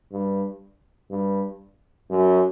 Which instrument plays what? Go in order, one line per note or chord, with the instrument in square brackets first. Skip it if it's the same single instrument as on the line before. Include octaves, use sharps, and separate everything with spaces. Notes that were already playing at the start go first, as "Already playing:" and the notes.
[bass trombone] G2
G2
F#2